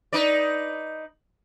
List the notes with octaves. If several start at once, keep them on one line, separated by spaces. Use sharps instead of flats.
D#4 B4 D5